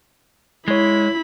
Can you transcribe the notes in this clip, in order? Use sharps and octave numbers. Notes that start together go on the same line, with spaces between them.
G#3 E4 C#5 B5 G#6